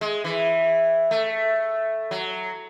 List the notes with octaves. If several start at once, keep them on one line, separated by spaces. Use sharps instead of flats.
G#3
E3
A3
F#3